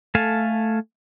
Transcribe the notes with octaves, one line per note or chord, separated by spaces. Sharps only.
A3 A4 F5 G#5 A5